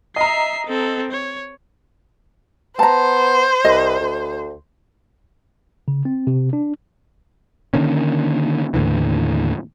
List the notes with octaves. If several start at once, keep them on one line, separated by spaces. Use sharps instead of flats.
D#5 E5 A#5 C7
C4 A4
C#5
B3 C5 A5 A#5
C2 D#5
D2
C#3
C4
C3
D4
D3 D#3 A#3 C#4
D#2 A2 D3 E3